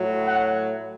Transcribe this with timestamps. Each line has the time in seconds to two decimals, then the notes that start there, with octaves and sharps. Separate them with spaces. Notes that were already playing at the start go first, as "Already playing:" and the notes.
Already playing: A2 F#3
0.27 F#5